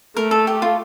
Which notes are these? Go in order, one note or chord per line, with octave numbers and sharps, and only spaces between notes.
A3 A#4
A4
G4
F4